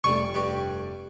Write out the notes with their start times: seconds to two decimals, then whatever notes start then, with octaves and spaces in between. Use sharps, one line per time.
0.04 F1 G3 A3 G#5 C#6
0.34 G2 G4